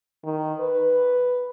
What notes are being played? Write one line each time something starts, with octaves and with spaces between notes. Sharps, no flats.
D#3
B4